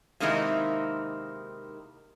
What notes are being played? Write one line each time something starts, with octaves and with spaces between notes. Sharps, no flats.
C3 D#3 G#3 A#3 D#4 E4